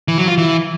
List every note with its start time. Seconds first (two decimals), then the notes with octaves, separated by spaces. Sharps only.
0.08 E3
0.18 F#3
0.28 F4
0.38 E3